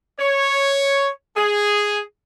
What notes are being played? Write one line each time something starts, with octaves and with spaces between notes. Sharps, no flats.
C#5
G#4